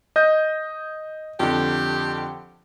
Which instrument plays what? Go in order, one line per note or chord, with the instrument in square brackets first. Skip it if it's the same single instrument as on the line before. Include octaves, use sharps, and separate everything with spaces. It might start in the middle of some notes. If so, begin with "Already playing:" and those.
[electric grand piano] D#5 G6
[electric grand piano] F2 D3 [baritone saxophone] G4